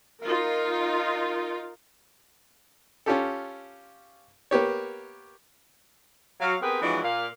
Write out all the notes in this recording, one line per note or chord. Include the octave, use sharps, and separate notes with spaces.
D#4 F4 A#4
C#4 F4 G4 A4
A#3 B3 G4 C#5
F#3 F5
B3 C4 G4 G#4 A#4 B4
F2 E3 F#3 G#3 D4
A#2 A#3 F5